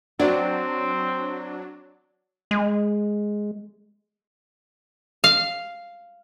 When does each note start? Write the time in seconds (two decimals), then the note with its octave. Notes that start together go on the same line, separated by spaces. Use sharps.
0.20 F#3 C4 D4 D5
2.51 G#3
5.24 F5